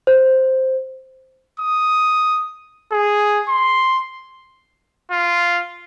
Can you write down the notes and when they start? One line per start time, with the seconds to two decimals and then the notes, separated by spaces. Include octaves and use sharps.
0.07 C5
1.60 D#6
2.92 G#4
3.49 C6
5.11 F4